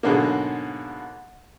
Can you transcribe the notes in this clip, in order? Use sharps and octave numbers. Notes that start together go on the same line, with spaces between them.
G#2 B2 D3 F#3 G#3 A#3